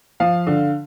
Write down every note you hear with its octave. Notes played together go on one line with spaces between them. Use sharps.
F3 F5
D3